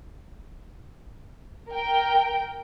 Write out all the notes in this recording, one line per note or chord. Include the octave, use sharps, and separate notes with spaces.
A#4 G5